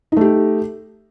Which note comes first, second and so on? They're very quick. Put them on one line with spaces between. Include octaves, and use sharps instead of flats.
D#4 A3 G4